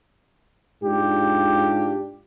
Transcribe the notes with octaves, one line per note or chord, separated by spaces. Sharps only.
G#2 D4 F4 G4